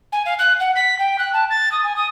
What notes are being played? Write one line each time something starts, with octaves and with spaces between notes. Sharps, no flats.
G#5
F5
F#6
F#5
B6
G5
F#6
A5
A6
D#6
G#5
D#6